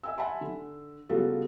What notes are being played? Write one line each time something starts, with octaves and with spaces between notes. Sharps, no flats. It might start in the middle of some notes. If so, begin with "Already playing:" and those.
E5 G#5 E6
E5 F#5 G#5 A5 B5 C6
D3
C#3 G3 B3 F4 F#4 A4